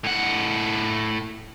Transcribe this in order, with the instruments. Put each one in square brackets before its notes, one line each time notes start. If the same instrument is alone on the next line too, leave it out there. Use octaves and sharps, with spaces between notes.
[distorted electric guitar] A2 F#5